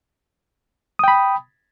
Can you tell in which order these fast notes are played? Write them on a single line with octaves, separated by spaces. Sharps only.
D#6 G5 B5